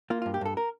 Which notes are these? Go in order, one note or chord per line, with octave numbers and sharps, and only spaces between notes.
A#3 F4
F4
G2
G4
G2 A4
A#4